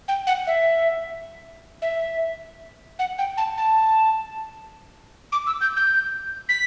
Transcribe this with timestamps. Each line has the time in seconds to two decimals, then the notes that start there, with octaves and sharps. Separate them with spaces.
0.08 G5
0.27 F#5
0.47 E5
1.82 E5
2.99 F#5
3.18 G5
3.37 A5
3.58 A5
5.32 D6
5.47 E6
5.61 G6
5.77 G6
6.49 B6